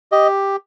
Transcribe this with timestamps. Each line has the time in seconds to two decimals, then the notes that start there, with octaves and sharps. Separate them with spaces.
0.12 G4 D#5